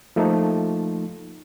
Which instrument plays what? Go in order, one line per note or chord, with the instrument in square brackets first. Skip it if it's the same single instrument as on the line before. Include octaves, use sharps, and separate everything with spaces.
[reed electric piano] F3 A3 A#3 D#4